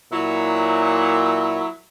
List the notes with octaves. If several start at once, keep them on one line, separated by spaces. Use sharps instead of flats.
A#2 F#3 E4